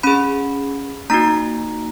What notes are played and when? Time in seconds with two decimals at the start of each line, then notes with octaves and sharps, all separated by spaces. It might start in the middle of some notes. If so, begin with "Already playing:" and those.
0.03 C#4 G#4 B5
1.10 A#3 D#4 F#4 A#5